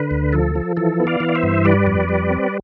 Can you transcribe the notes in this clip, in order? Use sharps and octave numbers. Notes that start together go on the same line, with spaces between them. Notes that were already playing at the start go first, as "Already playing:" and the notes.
Already playing: D3 B4
D2
F3 A4
F3
E3 A4
B3
D5 F5
E3
D5
C5 E5
G2
G3 B4 D5
F2
G3
C4